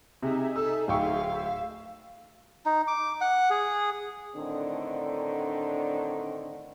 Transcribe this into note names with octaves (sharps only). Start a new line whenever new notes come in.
C3 D#4 G#4 E5
A4 E6
D1 F5 G5 C#6
E5 E6
D#4
D6
F#5
G#4
A2 D3 D#3 C4 D4